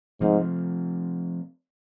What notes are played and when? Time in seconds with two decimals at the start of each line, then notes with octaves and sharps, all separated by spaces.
0.21 G#2 C3 F3 C4